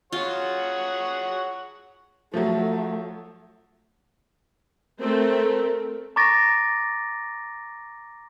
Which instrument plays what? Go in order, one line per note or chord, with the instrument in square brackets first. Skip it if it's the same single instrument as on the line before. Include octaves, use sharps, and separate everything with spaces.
[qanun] F4 [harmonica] G#4 C#5 F#5
[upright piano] F3 F#3 [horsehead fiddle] A3
[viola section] A3 C4 A4 [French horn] A#4
[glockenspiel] A#5 C#6 D6 A6 A#6 D7